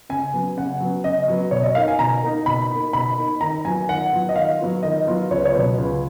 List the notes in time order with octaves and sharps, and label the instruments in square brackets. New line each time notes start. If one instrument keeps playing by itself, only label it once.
[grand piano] C#3 [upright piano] G#5
[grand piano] F#3 B3
[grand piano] C#3 [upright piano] F#5
[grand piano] F#3 B3
[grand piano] C#3 [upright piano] D#5
[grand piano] F#3 B3
[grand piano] B2 [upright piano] C#5
[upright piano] D#5
[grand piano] A#3 D#4 [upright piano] F5
[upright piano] G#5
[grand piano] B2 [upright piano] A#5
[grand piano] A#3 D#4
[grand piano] B2 [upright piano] B5
[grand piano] A#3 D#4
[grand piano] B2 [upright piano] B5
[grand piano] A#3 D#4
[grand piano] D#3 [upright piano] A#5
[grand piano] F#3 B3 F4 [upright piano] G#5
[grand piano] D#3 [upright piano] F#5
[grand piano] F#3 B3 F4
[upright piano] D#5
[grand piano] D#3 [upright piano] F5
[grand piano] F#3 B3 F4
[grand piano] D#3 [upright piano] D#5
[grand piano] F#3 B3 F4
[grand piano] C#2 [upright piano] C#5
[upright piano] B4
C#5
[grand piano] B2 F#3 B3
[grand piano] C#2 [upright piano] B4